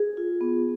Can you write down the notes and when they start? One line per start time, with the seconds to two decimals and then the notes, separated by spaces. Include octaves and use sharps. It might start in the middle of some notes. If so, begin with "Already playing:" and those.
Already playing: G#4
0.17 F4
0.41 B3